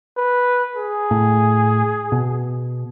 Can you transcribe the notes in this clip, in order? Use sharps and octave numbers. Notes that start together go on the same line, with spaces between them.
B4
G#4
A2
B2